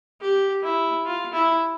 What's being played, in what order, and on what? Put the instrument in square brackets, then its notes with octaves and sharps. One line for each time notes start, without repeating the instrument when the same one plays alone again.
[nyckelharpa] G4
E4
F4
E4